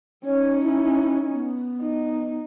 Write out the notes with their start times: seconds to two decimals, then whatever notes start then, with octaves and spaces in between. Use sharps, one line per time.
0.25 C#4 D#4 C#5
0.62 E4
1.33 B3
1.82 D#4